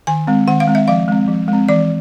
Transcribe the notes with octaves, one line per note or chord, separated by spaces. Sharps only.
D#3 G#5
G#3 C4
D#3 F#5
F5
G#3 C4
E5
F3 F5
G#3 C4
F3
G#3 C4
E3 D5